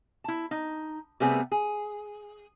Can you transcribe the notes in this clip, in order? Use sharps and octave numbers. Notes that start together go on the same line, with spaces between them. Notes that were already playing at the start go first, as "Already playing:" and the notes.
E4 A5
D#4
C3 G3 A3 B3 C4 G#4
G#4